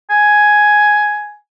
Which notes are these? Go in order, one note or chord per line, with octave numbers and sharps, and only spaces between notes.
G#5